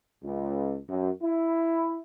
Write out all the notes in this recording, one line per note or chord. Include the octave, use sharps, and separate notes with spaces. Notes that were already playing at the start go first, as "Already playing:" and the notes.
C#2
F#2
E4